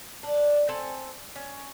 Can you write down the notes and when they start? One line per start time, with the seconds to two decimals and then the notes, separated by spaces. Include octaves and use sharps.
0.23 D4
0.69 C4 A4 G#5
1.36 C#4